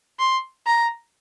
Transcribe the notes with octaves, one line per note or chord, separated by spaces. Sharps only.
C6
A#5